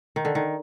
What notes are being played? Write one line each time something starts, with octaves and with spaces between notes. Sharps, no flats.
D#3
D3
D#3